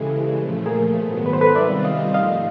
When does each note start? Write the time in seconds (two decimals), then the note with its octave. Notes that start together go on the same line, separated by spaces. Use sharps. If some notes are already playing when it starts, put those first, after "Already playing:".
Already playing: C#3 E3 G#3 G4 A4
0.36 A#2 F3 A3
0.66 G#4 A#4
0.96 G#2 D#3 F#3 B3
1.26 B4
1.33 C5
1.41 A4 B4
1.55 C3 D#3 G3 C4 F4 D5 E5
1.85 D#5 F5
2.14 G#2 F3 A3 D#5 F5